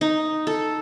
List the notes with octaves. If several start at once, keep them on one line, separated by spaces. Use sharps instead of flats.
D#4
A4